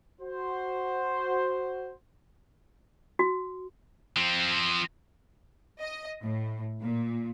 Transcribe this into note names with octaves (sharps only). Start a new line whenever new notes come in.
F#4 C5
F#4
F3 C4
D#5
A2
A#2